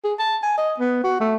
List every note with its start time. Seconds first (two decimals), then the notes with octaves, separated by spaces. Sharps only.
0.04 G#4
0.19 A5
0.42 G#5
0.57 D#5
0.79 B3
1.04 F#4
1.20 A3